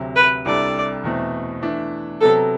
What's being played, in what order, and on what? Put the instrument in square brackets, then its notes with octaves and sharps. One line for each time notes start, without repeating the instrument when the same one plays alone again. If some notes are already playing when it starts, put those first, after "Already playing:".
Already playing: [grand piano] D2 C3 F#3
[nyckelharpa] B4
[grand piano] C2 C3 G3 D4 A4 [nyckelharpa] D5
[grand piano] E2 B2 A3 C4
E3 A3 D4
[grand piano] C3 F#3 B3 [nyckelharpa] A4